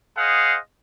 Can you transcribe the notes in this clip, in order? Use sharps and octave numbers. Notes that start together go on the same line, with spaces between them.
G#4 C5 D#5 F5 F#5